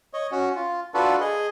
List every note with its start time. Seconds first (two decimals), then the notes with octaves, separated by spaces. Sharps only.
0.13 C#5 D#5
0.32 C#4 F#4
0.56 F4
0.94 D4 F4 F#4 A4 B4
1.21 G#4 D#5